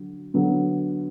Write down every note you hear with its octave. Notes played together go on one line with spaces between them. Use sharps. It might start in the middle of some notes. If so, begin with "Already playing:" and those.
Already playing: D3 F#3
D3 F#3 B3